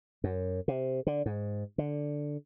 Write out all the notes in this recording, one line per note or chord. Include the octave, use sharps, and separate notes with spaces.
F#2
C3
D3
G#2
D3